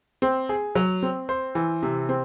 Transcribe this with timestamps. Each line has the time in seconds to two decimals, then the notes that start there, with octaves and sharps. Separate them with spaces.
0.22 C4
0.49 G#4
0.75 F#3
1.03 C4
1.29 C5
1.55 E3
1.83 C3
2.09 C4